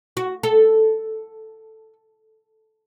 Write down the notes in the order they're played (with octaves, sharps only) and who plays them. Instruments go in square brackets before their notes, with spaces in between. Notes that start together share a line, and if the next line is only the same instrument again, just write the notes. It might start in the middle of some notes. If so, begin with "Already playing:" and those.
[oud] F#4
A4